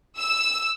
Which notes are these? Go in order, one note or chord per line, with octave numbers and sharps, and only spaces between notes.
E6